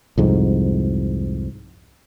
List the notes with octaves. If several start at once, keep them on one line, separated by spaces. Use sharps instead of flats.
C2 F2 G#2